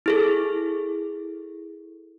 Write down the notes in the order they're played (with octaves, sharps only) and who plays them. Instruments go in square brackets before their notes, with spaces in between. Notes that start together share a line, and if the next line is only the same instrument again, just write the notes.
[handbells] E4 G#4 A4